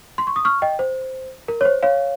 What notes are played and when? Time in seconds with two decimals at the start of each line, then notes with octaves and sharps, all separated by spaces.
0.18 C6
0.27 C#6
0.36 D#6
0.45 C#6 F6
0.62 D#5 G5
0.79 C5
1.48 A#4
1.61 C#5
1.65 C5
1.83 C#5 F5